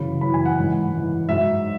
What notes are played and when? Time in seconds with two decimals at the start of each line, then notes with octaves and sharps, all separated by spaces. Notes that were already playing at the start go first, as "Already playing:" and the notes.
Already playing: F#2 C#3 E3 B5
0.21 F#2 C#3 E3 B5
0.34 G#5
0.46 F#5
0.58 G#2 E3
0.93 G#2 E3
1.29 G#2 F#3 E5